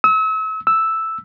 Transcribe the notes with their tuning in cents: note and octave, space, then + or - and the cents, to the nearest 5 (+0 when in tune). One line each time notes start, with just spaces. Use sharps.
E6 -40
E6 -5